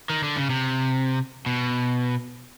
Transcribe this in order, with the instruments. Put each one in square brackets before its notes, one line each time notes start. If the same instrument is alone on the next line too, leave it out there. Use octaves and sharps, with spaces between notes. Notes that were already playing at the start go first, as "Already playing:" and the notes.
[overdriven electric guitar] D#3
D3
C#3
C3
B2